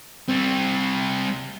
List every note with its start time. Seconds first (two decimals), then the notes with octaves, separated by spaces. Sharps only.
0.29 G3 C4